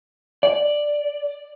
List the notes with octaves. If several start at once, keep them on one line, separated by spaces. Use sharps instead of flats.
D5